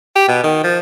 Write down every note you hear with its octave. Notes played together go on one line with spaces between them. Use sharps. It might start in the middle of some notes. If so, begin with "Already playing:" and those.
G4
B2
D#3
F3